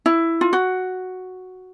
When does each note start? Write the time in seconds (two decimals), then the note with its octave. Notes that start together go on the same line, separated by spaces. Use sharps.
0.06 E4
0.41 F4
0.53 F#4